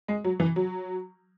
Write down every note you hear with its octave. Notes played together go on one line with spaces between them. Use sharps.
G#3
F#3
E3
F#3